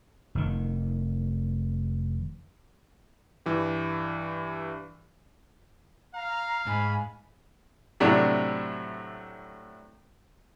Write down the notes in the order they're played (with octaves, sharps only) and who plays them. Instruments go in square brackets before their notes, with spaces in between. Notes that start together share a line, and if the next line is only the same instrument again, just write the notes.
[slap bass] F1 D#3
[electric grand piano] G2 E3 G4
[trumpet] F5 [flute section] A#5
[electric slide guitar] G#2 [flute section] G#5 B5
[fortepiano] A2 C3 F#3 D4 E4